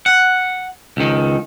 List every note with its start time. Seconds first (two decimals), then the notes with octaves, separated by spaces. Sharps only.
0.06 F#5
0.97 C#2 D#3